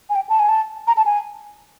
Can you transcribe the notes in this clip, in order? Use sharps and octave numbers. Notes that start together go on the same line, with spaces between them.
G#5
G5
A5
G#5
A5
A#5
A5
G#5